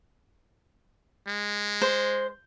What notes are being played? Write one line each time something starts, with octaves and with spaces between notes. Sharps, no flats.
G#3
C5